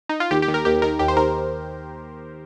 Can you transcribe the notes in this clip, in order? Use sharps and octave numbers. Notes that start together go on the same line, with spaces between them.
D#4
F4
D#2 G4
G4
D#3
A#4
D#2 G4
D#3 A#4
D#2 G4
C5
D#3 A#4